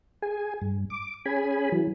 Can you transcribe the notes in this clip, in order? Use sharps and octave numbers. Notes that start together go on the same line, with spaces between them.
G#4 G#5
G2
D6
C#4 G#4 G#5 B5
E3 F#3